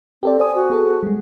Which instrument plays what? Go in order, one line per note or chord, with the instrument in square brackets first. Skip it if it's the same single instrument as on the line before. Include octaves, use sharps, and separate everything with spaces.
[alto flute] C4 [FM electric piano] G4 A4 D5
[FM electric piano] C5 D5 D#6 [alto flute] G#5
[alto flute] F#4
[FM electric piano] B3 G#4 A4
G3 G#3